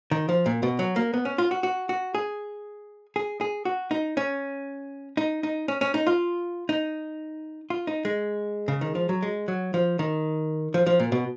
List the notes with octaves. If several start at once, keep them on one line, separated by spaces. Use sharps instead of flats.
D#3
F3
A#2
B2
F#3
A#3
B3
C#4
F4
F#4
F#4
F#4
G#4
G#4
G#4
F#4
D#4
C#4
D#4
D#4
C#4
C#4
D#4
F4
D#4
F4
D#4
G#3
C#3
D#3
F3
F#3
G#3
F#3
F3
D#3
F3
F3
A#2
B2